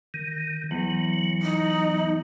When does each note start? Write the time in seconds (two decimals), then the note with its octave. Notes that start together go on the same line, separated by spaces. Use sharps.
0.14 D#3
0.71 E2 F#3
1.42 D#4